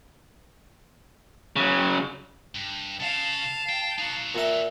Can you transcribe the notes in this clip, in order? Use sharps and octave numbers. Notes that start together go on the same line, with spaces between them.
C#3 F#3
G2
C#3 F5 A5
G5
D#4 F#4
A#2 F#4 A4 E5